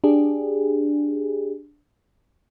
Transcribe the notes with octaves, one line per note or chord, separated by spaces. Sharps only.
D4 G4 G#4